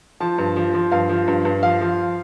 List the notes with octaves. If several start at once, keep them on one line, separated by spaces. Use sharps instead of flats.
F3 A5
G2
F3
F3
G2 F5
F3
G2
G2
F3 F5
F3